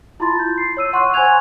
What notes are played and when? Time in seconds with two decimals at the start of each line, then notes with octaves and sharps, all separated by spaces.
0.20 E4 F4 A5 B5 C6 A6
0.39 G6
0.58 C7
0.77 C#5 E6 D#7
0.93 F#5 C6 C#6 F#6
1.14 C5 G#5 C#6 F#6 G#6 F7